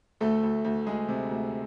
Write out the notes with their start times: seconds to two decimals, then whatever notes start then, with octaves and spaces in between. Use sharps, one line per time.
0.20 D2 A3 A4
0.43 D2
0.64 D2
0.87 D2 G#3 G#4
1.09 C3
1.30 D2